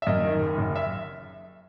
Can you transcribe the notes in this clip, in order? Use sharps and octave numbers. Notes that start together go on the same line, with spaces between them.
E5
F#2 D#5
D#3
F#1
F#2
E5